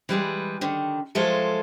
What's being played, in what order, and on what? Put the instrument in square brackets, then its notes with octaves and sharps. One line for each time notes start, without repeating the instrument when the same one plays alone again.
[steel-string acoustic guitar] E3 G3 G#3 B4
D3 D#3
F3 F#3 G#3 F4 A4 E5